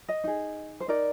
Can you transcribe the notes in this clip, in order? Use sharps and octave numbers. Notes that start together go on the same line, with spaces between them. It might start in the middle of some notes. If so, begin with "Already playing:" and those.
D#5
D#4 G#4
C5
D#4 A#4 D5